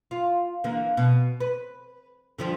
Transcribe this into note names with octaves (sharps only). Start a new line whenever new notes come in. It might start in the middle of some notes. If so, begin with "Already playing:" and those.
F4
D3 E3 A#3
B2
B4
D3 F3 G3